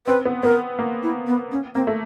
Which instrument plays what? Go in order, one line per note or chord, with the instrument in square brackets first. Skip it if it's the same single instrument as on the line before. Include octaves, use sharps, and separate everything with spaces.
[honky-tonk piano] C4 [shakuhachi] B4
[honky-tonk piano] B3
[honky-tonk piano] B3 [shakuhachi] A#4
[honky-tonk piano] A#3
[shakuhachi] E4
B3
C#4
[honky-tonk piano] A#3 [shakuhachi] C4
[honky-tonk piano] A3